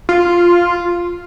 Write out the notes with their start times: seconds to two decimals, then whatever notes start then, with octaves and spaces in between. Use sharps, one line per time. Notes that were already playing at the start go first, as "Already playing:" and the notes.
0.09 F4